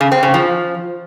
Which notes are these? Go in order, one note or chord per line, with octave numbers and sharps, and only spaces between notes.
C#3
C4
C#3
F3